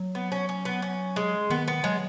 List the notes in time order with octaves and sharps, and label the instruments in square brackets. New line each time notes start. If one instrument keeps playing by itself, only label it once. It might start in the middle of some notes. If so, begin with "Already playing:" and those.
Already playing: [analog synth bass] F#3
[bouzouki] B3
C#4
C#4
B3
C#4
G#3
[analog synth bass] D#3 [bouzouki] B3
[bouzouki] B3
[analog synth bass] F#3 [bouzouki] G#3